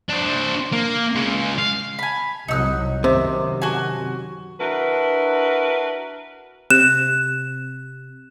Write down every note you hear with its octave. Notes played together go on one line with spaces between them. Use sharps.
D4 C5
A#3
C#3 G#3
F5
G#5 B5
C2 F#3 D#4 E6 F#6
F#2 C3 D#3
F#4 G#5
D4 E4 F#4 A#4 B4
C3 F#6 E7